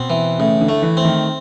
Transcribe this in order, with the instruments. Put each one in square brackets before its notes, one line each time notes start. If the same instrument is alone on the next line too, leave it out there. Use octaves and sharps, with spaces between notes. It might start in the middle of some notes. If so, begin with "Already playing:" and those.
Already playing: [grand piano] B2 [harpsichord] C4
[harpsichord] E3
[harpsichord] A2 [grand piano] C#3
[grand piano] D3
[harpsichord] A3
[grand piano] E3
[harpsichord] C4
[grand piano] D#3